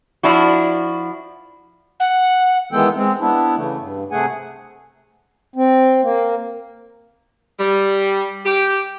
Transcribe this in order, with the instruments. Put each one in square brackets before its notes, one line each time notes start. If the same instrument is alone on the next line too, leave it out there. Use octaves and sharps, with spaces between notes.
[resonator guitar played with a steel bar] F3 D4 E4 F#4
[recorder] F#5
[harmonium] D#3 E3 G#3 B3 A4 G5
G#3 C4
B3 D4 E4
C#3 E3 A3
G2
C3 A3 G#4 F#5 G#5
C4
A#3
[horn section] G3
G4